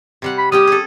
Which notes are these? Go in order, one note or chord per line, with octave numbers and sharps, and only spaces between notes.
C3 G3 F#5
B5
G3 C#4 G4 G5 D#6
G#4 A4